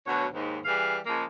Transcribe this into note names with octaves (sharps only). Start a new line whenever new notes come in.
D2 B2 F#3 C#5
D#2 G#2
E3 G3 G#4 F5
C#3 F3 G#3 A#3